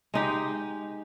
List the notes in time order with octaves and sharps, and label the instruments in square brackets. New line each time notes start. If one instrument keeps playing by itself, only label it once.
[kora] G#3 D#4 G4